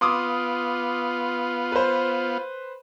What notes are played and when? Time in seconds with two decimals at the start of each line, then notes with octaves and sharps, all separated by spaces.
0.01 B3 F4 C6 D6 D#6
1.72 B4 C5